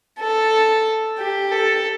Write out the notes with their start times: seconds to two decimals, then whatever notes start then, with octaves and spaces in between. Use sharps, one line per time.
0.20 A4
1.19 G4
1.52 A4